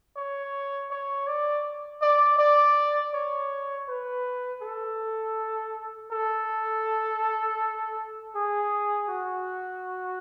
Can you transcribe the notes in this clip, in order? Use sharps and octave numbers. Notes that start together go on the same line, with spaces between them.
C#5
C#5
D5
D5
D5
C#5
B4
A4
A4
G#4
F#4